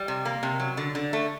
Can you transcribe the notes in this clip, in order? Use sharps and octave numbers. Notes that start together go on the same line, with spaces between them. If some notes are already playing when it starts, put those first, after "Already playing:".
Already playing: G3
C3
A#3
C3
F#3
D3
D3
A3